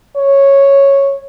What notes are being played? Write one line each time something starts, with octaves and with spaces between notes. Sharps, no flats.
C#5